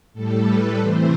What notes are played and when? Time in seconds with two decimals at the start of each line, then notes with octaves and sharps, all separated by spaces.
0.14 A2 G3 A4
0.46 B4
0.78 C3 E3 A3 C5